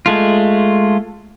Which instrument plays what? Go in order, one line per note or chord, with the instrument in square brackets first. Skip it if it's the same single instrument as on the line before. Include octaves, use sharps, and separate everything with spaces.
[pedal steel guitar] G#3 A3 F4